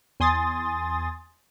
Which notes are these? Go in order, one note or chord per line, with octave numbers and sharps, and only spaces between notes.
E2 G#5 C6 D#6 A6